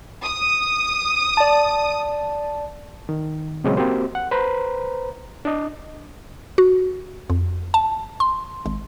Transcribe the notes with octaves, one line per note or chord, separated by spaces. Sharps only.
D#6
D5 A5
D#3
A#2 C#3 F#3 G#3 C4 C#4
A#3 C4 F#4 G4 C5
F#5
B4 C5 A#5
D4 D5 D#5
F#4
F2
A5
C6
G#1